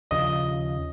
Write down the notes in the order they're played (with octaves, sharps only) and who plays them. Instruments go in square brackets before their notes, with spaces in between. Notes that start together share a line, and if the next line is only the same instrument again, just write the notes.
[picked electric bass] D#2 C#3 F3 [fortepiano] D#5